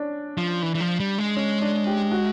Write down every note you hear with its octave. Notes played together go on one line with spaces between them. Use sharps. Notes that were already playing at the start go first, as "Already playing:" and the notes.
Already playing: C#4 D4
F3
E3
E3
F3
G3
G#3
C#4
D4
G4
F#4